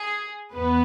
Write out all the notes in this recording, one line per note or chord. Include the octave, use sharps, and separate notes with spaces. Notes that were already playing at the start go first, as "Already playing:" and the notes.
Already playing: G#4
E2 B3 B4